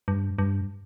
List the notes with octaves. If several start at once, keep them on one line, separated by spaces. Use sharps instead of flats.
G2
G2